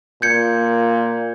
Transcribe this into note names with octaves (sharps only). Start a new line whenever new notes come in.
A#2 G6 G#6 C#7